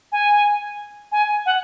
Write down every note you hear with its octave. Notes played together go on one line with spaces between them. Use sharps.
G#5
G#5
F#5